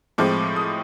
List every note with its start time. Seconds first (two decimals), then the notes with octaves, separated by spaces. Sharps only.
0.18 A2 F3 G#3 C4 D6
0.56 D#6